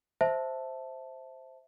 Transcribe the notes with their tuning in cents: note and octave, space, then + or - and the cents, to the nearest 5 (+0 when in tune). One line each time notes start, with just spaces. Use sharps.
C5 +0 E5 +0 A5 +0